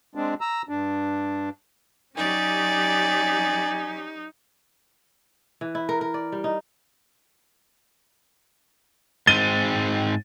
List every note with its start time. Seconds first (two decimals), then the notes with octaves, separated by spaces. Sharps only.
0.15 G#3 C4 D4
0.41 A#5 E6
0.69 G2 D4
2.17 F#3 C#4 D#4 G4 D5 G#5
5.61 E3
5.75 E4
5.89 A#4
6.01 A#4
6.14 D5
6.32 G3
6.44 D#4
9.27 G#2 G#3 C4 A6 D#7 G7